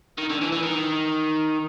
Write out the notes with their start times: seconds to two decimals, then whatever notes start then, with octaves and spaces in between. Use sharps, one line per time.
0.18 D#3
0.30 D3
0.42 E3
0.53 E3
0.63 D#3